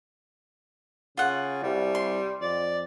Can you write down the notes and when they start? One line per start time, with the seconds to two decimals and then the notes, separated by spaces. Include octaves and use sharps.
1.17 C#3 F4 F#5
1.63 C2 G3
1.95 C6
2.41 F2 D5